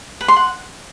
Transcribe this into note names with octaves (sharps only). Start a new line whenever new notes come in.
B4
C6
F#5